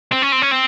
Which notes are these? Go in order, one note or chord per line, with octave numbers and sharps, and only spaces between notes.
C4
C#4
C4
C#4
C4